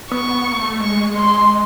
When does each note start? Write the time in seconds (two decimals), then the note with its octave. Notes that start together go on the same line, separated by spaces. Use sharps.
0.12 B3 C#6
0.34 B3
0.52 A#3
0.57 A3
0.80 G#3 C#6
1.15 C6